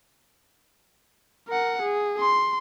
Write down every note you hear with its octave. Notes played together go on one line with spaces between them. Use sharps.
A#4 F#5
G#4
C6